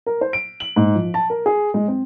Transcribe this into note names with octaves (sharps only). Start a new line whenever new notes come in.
A#4
C5
D7
F#7
G#2
F3
A5
A#4
G#4
G#3
C4